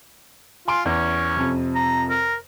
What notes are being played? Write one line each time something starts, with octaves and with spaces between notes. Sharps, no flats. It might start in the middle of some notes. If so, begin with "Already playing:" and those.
F4 G#5 C6 D7
E2 C#4
F2 C3
A#5
A#4